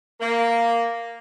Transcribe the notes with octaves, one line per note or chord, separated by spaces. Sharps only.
A#3